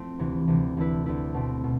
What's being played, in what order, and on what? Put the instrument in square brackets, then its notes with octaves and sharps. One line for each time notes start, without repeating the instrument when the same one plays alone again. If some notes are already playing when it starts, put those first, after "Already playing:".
Already playing: [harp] F3 A3 C4 E4
D2 C3 E3
D2 C3 E3
D2 D3 A3 E4 B4
D2 D3 A3 E4 B4
B2 A3 C4 E4
B2